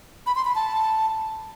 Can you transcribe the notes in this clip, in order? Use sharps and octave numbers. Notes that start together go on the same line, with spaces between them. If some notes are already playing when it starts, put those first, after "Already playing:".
B5
C6
B5
A5